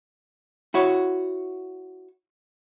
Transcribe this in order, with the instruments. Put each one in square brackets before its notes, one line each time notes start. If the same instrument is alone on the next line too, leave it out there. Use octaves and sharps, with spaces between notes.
[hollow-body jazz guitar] E4 F#4 C#5